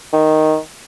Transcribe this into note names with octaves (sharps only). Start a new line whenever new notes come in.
D#3